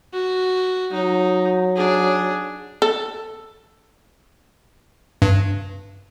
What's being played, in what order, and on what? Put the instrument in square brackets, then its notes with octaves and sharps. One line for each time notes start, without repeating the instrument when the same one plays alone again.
[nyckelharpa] F#4
[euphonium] F#3 [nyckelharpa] D#4
[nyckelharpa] D4 G#4
[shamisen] A4
[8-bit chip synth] G2